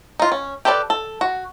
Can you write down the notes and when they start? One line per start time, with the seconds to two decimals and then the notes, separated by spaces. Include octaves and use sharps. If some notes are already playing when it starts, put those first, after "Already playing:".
0.19 D#4 F4
0.32 C#4
0.65 G4 A4 B4 C5 D5
0.90 A4
1.21 F#4